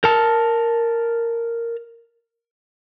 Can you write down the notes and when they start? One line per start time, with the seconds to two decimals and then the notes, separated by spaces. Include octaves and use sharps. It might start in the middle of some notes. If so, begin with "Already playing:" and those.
0.04 A#4 A5